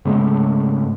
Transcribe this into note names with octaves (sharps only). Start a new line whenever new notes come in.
G#2 C#3 G#3 A3